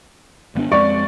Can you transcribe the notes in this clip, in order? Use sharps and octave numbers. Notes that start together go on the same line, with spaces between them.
G#1 B3 D4
F2 G#3 C4 D5 C#6